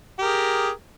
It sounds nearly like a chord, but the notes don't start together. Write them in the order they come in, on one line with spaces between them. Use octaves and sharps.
G4 A#4 G#4